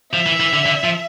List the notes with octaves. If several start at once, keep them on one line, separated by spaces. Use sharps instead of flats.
F3 E5
E3
E3
D3
D3
F3